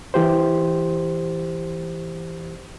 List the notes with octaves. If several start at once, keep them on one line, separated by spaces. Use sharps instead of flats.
E3 G4 C5